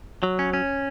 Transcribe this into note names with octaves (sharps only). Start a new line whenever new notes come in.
F#3
C#4
C#4